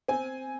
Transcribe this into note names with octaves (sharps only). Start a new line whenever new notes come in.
C4 G#5